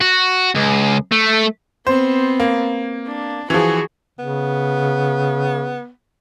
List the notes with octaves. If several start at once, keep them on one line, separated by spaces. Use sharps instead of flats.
F#4
C#2
A3
B3 C4 C5
A#3
D4
E3 F3 F#4 G#4
C#3 B3